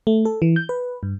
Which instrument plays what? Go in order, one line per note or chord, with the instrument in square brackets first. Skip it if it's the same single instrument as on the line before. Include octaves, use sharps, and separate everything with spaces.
[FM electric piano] A3
A4
E3
G6
B4
G2